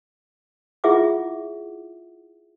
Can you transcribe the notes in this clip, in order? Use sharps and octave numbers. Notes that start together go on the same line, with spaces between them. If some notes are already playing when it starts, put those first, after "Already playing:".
E4 F4 G#4 E5 F#5 D6